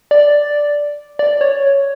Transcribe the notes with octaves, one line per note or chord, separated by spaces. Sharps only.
D5
D5
C#5